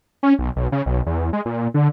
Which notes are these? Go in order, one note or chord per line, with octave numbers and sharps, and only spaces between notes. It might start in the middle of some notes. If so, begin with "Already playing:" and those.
C#4
B1
B1
C#3
B1
E2
G#3
A#2
D3